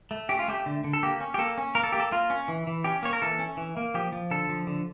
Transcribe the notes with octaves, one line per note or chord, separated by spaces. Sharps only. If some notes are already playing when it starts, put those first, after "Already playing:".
A3
C#4 G4
F4
A3 G4
D3
D3
A4
A#3 G4
C#4
G4
A#3 A4
C#4
A#3 A#4
A4
A#3 G4
A4
A#3 F4
C#4
E3
E3
C#4 G4
A#3 C#5
A#4
E3 A4
C#4
E3
A#3
F3 G4
F3
D3 A4
F3
D3